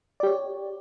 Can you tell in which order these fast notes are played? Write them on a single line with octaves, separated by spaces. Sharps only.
D5 G4 C#5